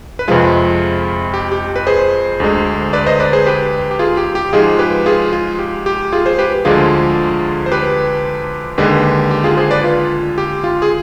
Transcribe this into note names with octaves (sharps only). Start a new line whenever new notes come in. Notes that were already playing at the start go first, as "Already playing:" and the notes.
B4
F2 C3 F3 G#3 F4 G#4
G4
G4
B4
G#4 C5
D2 D3 G#3
B4 D5
C5 D#5
B4 D5
G#4 C5
G4 B4
G4
F4 G#4
G4
G4
G#2 F3 G#3 F4 G#4
G4 B4
F4 G#4
F4
G4
G4
F4 G#4
G#4 C5
G4 B4
D2 D3 F3 G#3 F4 G#4
C5
G4 B4
D#2 D3 G#3 G4 B4
G4
F4 G#4
G#4 C5
B4 D5
F4
G4
F4
G#4